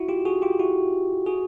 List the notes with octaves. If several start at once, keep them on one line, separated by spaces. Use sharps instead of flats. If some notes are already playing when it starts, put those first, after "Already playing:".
Already playing: E4 F#4
F4 G4
F#4 G#4
F4 G4
E4 F#4
F#4 G#4